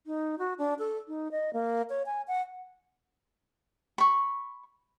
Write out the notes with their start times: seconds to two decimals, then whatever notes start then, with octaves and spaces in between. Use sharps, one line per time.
0.06 D#4
0.39 F#4
0.58 D4
0.79 A4
1.08 D#4
1.31 D#5
1.53 A#3
1.90 C#5
2.06 G#5
2.28 F#5
3.98 B5 C#6